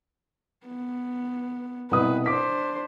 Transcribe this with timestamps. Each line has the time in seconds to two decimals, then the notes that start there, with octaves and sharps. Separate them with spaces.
0.67 B3
1.91 C2 B2 B4 D#6
2.26 D4 C5 D6 B6